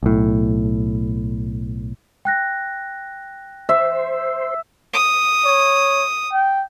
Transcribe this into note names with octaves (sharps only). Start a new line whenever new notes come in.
B1 A2
G5 F#6 A#6
C5 E5
D#6
C#5
G5